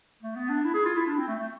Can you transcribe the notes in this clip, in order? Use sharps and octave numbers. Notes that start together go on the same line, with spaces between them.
A3
B3
D4
E4
G#4
F4
E4
D4
C4
A3
A3